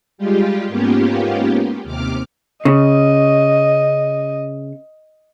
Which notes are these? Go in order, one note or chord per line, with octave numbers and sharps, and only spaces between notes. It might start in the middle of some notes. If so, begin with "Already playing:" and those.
G3 G#3 F4 G4
G#2 A#3 B3 C#4 F4 G4
D#2 C3 D6 F6
C#3 D#5